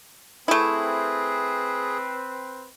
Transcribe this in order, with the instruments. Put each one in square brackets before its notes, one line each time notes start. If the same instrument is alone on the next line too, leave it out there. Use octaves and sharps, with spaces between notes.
[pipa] A3 E4 [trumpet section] C4 B4 [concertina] G#4